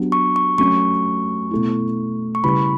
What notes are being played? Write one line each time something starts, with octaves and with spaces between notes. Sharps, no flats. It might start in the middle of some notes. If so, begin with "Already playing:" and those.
Already playing: F#3 B3 D4 G4
C#6
C#6
F#3 A3 C#4 C#6
B2 A3 E4
C#6
C#3 G3 C#4 E4 B4 B5